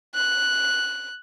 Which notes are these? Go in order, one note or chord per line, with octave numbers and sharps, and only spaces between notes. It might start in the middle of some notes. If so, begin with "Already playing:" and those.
F#6